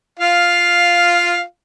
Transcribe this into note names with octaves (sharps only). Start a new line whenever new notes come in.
F4 F5